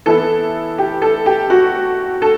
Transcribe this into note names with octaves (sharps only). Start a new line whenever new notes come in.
E3 B3 E4 A4
G4
A4
G4
F#4
A4